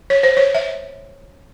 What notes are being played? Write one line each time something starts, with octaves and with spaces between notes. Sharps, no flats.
C#5
C5
C#5
E5